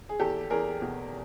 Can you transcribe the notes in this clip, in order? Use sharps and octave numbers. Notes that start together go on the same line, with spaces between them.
G#4
E2 G4 A4
E2 G#4 A#4
B2